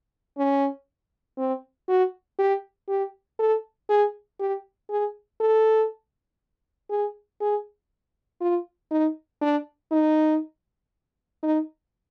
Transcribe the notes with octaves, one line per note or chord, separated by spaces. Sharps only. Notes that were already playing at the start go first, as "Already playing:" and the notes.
C#4
C4
F#4
G4
G4
A4
G#4
G4
G#4
A4
G#4
G#4
F4
D#4
D4
D#4
D#4